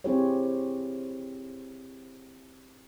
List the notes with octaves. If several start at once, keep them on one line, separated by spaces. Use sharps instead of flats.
C4 E4 G4 G#4 C5 C#5